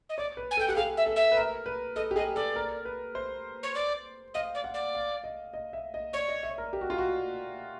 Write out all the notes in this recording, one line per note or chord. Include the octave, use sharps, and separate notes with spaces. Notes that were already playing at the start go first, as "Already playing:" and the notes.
D#5
C#5 D5
B4
G#5
A4 G5
G4 F#5
G#4 F5
E5
A4
E5
B4
A#4
B4
A4 D#5
G4
G#4 D#5
A4 D5
A#4
B4
C5
C#5
D5
D#5 F5
D5
F#5
D5
F5
D#5
D#5
E5
D#5
C#5 D5
D#5
E5
A#4
G4
F#4
F4
F#4